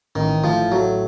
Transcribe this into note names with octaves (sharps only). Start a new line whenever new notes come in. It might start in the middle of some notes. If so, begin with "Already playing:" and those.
A1 D#3
A2 F3
F#3 A3